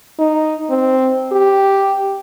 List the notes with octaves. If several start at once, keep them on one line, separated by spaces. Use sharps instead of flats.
D#4
C4
G4